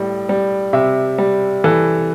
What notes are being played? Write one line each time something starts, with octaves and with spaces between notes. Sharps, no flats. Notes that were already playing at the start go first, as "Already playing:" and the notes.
Already playing: A2 G3
G3
C3 E5
G3
E3 A4